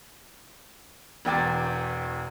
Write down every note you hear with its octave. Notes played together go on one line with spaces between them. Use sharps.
E1 E2 G5 D6 A6